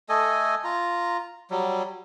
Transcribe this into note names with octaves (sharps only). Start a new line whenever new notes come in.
A3 A4 D#5 G#5
F4 A#5
F#3 G3